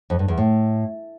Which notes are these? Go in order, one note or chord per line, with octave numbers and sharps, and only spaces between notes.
F2
G2
E2
A2